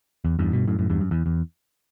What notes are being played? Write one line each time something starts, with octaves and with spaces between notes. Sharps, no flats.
E2
E2 G2
G2 B2
F#2 A2
F#2 A2
E2 G2
F#2
E2
E2